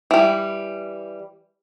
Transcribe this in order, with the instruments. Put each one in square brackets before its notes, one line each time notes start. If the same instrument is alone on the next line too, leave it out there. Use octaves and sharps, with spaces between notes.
[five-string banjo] E3 G3